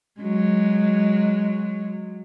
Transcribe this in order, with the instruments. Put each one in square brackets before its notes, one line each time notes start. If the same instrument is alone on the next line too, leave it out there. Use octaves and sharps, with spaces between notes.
[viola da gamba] F#3 G#3